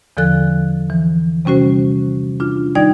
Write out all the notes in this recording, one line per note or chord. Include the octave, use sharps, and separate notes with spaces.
E2 D3 F3 A4 F#6
E3
C3 G3 C#4 F#4 C5
D4 F4
D#3 G3 D#4 D5 G5 G#6